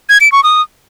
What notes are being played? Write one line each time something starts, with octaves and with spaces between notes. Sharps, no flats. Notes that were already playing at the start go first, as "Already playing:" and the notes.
G#6
D7
C#6
D#6